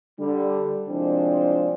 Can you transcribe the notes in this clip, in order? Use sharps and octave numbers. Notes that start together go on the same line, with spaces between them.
D3 G3
C2 F3 G#3 C4 D4